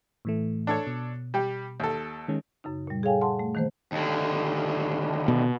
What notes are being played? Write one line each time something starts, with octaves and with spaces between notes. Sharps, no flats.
A2 E3 A3
D4 A4 C#5
B2
G3 G4
D#2 A4
D#3 G#3 C#4
F#2 C#3 D#4
A#2 G3
G#4 A4 C#5 F5 G5 G#5
F#5 A5 C6
A3
D#3 E3 A3 A#3 C5
D#2 D3
B2